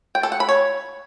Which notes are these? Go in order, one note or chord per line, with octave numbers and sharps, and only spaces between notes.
G5
A4
F#5
B5
C#5